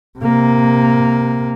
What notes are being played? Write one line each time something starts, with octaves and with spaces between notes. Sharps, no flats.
C3 A#3